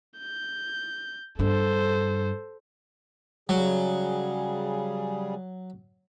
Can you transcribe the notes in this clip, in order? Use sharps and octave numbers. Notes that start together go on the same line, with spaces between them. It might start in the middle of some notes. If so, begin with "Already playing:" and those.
G6
G2 D4 A4 C5
C#3 F#3 G3 G#4